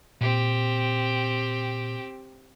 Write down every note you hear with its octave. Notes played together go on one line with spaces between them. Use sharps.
A#2 C4 G4